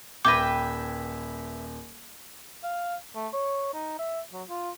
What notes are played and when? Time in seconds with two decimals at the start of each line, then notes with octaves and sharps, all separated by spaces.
0.25 D#1 B4 E5 G5 D6 G#6 A#6
2.63 F5
3.15 A3
3.33 C#5
3.74 D#4
3.99 E5
4.33 F#3
4.49 F4